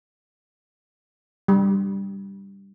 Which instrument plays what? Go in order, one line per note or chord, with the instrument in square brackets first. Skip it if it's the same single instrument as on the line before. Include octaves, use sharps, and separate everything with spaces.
[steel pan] G3